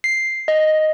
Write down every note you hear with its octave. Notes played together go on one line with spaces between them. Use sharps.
C7
D#5